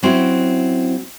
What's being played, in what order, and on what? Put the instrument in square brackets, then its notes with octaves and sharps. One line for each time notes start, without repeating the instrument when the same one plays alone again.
[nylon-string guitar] F#3 C4 C#4 E4 F#4